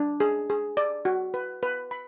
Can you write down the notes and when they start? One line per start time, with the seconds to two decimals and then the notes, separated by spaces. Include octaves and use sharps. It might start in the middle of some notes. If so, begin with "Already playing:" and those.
Already playing: D4
0.20 G#4
0.50 G#4
0.77 D5
1.05 F#4
1.34 B4
1.63 B4
1.91 B5